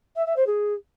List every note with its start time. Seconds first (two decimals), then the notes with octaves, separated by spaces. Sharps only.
0.16 E5
0.26 E5
0.36 C5
0.47 G#4